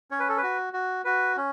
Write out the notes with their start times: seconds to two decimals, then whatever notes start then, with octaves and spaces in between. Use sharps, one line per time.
0.11 C#4 C#5
0.19 B4
0.29 A4
0.37 B4
0.43 F#4
0.73 F#4
1.05 F#4 B4
1.37 C#4